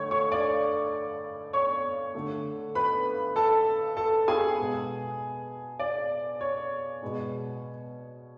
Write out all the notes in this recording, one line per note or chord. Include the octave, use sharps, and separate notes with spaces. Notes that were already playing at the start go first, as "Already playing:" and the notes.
Already playing: D3 A3 C#5 C#6 G#6
C#5 C#6
D5 D6
C#5 C#6
D3 A3
B4 B5
A4 A5
A4 A5
G#4 G#5
B2 G#3 B3
D5
C#5
B2 G#3 B3